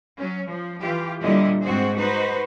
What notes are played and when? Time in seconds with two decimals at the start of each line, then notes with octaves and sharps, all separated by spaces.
0.17 F#3 C#4
0.49 F3
0.80 E3 F4 G4
1.20 A#2 D3 G3 E4 D#5
1.63 G#2 C4 F#4 G#4 C5
1.98 D#4 F#4 B4 C5